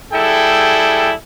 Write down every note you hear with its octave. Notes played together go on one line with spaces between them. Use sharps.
G3 E4 G#4 A4 G5